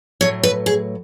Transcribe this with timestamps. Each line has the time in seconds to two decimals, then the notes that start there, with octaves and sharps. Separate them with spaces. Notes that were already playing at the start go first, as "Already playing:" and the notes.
0.21 A2 F#3 C#5
0.43 B4
0.66 G#4